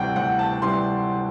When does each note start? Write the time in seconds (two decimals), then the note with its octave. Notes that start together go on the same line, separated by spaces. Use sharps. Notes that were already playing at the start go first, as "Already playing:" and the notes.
Already playing: D2 C3 E3 G3 F#5 G5
0.16 D2 F#5
0.39 A5
0.62 C3 E3 G3 C6